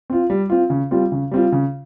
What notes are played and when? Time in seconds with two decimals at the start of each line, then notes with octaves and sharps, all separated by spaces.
0.10 C4 F4
0.30 G3
0.50 C4 F4
0.70 C#3
0.91 G3 C4 F4
1.12 C#3
1.31 G3 C4 F4
1.52 C#3